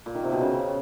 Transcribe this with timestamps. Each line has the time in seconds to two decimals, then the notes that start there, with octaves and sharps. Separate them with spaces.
0.06 A#2
0.15 D#3
0.23 C3
0.32 B2
0.41 C#3